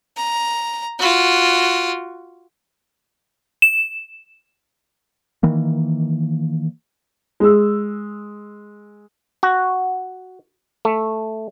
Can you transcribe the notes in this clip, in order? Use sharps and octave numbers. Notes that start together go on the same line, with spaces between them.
A#5
F4 F#4
E7
D#3 E3 A#3
G#3 E6
F#4
A3